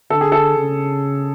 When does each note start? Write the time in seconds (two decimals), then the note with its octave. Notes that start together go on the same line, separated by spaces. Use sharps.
0.10 D3 A4
0.21 G#4
0.32 A4
0.58 C#3